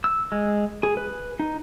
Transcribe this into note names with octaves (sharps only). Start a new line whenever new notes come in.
E6
G#3
G#4
B4
D#4